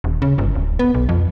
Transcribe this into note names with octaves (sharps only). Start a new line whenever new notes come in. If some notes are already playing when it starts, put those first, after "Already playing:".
D#1
C#3
G1
D1
B3
B1
F2